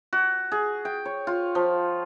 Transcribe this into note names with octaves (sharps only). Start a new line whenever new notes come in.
F#4
G#4
G5
C#5
F4
F3